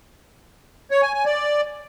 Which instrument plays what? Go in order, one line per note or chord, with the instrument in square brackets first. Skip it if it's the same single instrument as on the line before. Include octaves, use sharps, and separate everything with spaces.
[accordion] C#5
G#5
G#5
D5